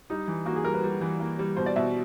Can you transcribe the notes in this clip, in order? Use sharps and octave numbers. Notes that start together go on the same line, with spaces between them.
G3 D#4
E3
A#3 F#4
G#4
G3 A#4
B4
G3
E3
A#3
G3
B2 C5
D5
B2 E5